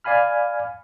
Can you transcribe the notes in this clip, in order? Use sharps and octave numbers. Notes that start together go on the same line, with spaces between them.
D5 F5 G#5 B5 F6